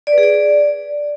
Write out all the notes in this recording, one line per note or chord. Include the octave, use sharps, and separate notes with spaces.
D5
B4
G#4
D5